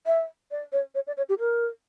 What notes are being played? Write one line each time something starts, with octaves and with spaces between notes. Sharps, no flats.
E5
D5
C#5
C#5
D5
C#5
G4
A#4